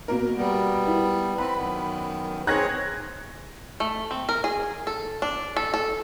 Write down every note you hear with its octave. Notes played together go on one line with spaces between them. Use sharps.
B2 A#3 A#4
G3 B3
E4
C4 B4 B5
F#2 D#3 B3
C4 G#4 C#5 F#6 G#6 A#6
A3
C4
A#4
G#4
A4
D4
A4
A4